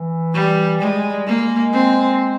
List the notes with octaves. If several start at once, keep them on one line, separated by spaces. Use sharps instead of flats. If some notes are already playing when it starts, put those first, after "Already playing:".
Already playing: E3
G3
G3 G#3
G3
G#3 A#3
C4